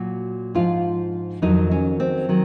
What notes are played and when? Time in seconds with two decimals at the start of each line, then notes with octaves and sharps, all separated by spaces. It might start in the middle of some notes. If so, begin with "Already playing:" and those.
Already playing: A#2 F#3 F#4
0.55 G#2 F3 F4
1.42 F2 D#3 F#3 D#4
1.71 C#4
2.00 C4
2.29 D#3 F#3